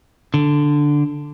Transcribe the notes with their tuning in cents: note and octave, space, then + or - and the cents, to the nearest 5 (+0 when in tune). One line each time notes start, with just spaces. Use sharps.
D3 +0